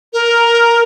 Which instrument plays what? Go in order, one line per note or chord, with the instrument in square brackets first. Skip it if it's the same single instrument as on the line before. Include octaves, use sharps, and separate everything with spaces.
[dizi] A#4